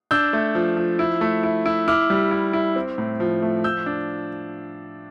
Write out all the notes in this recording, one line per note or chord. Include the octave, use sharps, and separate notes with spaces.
D4 E6 G6
A3
F3
F3
E4
A3
E4
E4
E4 D6 F6
G3
E4
E4
C4
A2
F3
A3
F3 E6 G6
D4